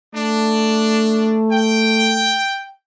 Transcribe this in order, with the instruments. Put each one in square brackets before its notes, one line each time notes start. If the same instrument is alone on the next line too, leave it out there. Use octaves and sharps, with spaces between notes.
[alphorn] A3 [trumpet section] D4
[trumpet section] G5